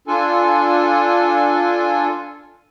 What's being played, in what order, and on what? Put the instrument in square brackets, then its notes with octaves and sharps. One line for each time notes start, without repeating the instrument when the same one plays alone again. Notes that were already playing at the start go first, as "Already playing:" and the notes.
[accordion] D4 F4 A4 G#5